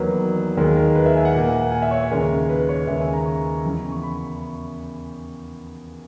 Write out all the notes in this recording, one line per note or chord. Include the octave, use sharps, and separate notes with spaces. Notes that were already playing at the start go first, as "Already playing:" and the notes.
Already playing: E2 D#3 F#3 A#3 B4
D#2 D#3 G#3
A#4
B4
E5
G#5
F#5
A#2 A#3
G#5
E5
C#5
D#2 C#3 G#3 A#4
B4
C#5
D#2 C#3 G#3 E5
G#5
A#5
C#6
E2 C#3 E3
C#6
B5